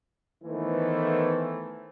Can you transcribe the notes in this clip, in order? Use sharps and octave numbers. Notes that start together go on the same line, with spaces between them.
D#3 E3 A3 B3 E4 C5